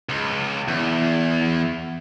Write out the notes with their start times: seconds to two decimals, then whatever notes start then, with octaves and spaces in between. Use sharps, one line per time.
0.09 C#2
0.68 E2